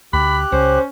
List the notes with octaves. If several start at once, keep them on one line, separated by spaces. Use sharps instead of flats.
D2 G4 B5 F#6
C#2 C#4 C5